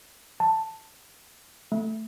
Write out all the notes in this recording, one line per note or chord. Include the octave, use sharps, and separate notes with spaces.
A5
A3